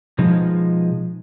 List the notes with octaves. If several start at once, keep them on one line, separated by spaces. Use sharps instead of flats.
B2 F3 G#3 D#4